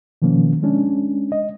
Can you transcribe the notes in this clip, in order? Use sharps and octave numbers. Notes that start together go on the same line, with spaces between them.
B2 D#3 F3 A#3 C#4
G#3 C#4 D4
D#5